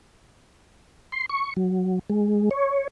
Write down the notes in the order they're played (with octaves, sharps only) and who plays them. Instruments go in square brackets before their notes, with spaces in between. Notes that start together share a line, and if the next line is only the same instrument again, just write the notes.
[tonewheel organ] C6
C#6
F#3
G#3
C#5